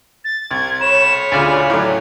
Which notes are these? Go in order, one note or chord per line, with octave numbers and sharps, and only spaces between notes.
A6
C2 G#6
C#5 B5 E7
D2 C#3 F4 D5 G#5 F6
A2 F#3